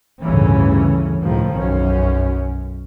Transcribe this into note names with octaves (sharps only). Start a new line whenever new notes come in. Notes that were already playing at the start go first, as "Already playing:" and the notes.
G1 D2 A2 C#3 E3 C#4
C#2 A2 D#3 F3
B1 F#2 C#4